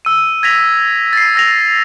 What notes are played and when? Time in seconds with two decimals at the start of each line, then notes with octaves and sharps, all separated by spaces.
0.05 E6 D#7
0.43 G#6 A#6 B6 F7
1.13 A6 C7
1.35 E6 A#6 F7